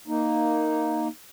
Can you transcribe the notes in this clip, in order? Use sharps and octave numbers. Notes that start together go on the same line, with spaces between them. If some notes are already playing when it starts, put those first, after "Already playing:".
A#3 D#4